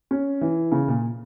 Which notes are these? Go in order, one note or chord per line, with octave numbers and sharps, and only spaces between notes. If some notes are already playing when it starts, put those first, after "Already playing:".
C#4
E3
C#3
A#2